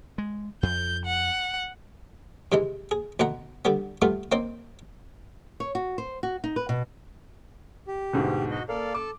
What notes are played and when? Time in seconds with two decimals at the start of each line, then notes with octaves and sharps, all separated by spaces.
0.18 G#3
0.63 F2 G6
1.05 F#5
2.52 C3 E3 G#3 D#4
2.91 G#4
3.20 D2 B2 F#5 A#5
3.65 D3 G3 B3
4.02 G3 A3 B3 F4
4.32 A#3 C4 D#4 C5
5.60 C#5
5.75 F#4
5.98 C5
6.23 F#4
6.44 D#4
6.56 B4
6.69 B2
7.87 G4
8.13 D2 G#2 B2
8.51 F#4 D#5
8.69 A#3 A4 D5 F5
8.94 A4 A5 D6